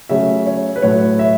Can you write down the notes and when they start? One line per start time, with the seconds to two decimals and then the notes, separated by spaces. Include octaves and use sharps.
0.09 C#3 F#3 A3 E5
0.46 C#5
0.76 B4
0.82 A2 F#3 A3 C#5
1.19 E5